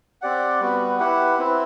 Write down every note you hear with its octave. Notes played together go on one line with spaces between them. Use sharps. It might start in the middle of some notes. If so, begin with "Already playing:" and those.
C4 G4 D5 F#5
G3 B3 F#4 B4
E4 G4 B4 F#5
C4 E4 B4